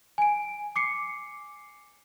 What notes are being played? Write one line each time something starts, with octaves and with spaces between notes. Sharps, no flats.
G#5 D7
D6 C7 C#7